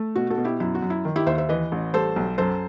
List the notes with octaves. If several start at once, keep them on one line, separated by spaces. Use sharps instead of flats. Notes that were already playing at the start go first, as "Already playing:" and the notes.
Already playing: A3
B2 F#4
F#4 A4
B2
E4 G4
F#2 E4
F#4
F#2
E4
D#3
E4 G4
D#2 C5 E5
C5 E5
E3 B4 D#5
A1
G3 A4 C5
B1
F#2 A4 C5